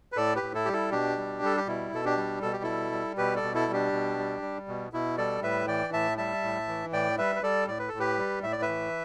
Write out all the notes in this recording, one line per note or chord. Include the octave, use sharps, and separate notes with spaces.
B4
A2 A4 D5
G4 B4
A2
E4 A4
G3 G4
E4 A4
B2 D4 G4
G3
G3 A4
G4
B2 E4
B2 A4
D4 G4
G3
B2 A4
G4
G3 E4 A4
G3
B2 G4 B4
A4 D5
B2
E4 A4
G3
D4 G4
B2
G3
G3
B2
B2 E4
G3 A4 D5
A2 B4 E5
E3 D5 G5
A2 E5 A5
G3 E5 A5
A2
E3
A2 D5 G5
G3 B4 E5
B4
G3 A4 D5
A2 D5
B4
A2 A4
G4 B4
G3
A2 E5
D5
B4 E5
E3